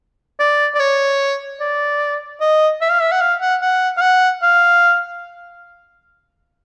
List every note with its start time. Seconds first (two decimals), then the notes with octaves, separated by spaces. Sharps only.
0.40 D5
0.75 D5
0.80 C#5
1.60 D5
2.41 D#5
2.81 E5
2.91 F5
3.01 E5
3.12 F#5
3.21 F5
3.41 F#5
3.61 F#5
3.97 F5
4.02 F#5
4.42 F5